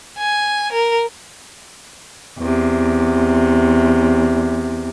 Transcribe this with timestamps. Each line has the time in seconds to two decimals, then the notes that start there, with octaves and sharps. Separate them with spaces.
0.18 G#5
0.72 A#4
2.39 E2 C3